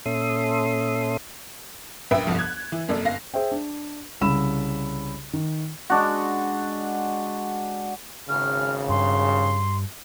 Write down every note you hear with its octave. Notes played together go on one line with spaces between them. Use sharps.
A#2 C#4 A4 E5 C6 D#6
A#1 F#2 B4 E5 G5
G1 C2 F2 F3
F#6 G#6
E3
F1 F#2 A#3 A4 D5
G1 F5 A#6
G#4 C5 E5 G5
D4
C2 C#3 B5 E6 E7
D#3
G#3 D4 F#4
G#1 C#3 F6
G2 C6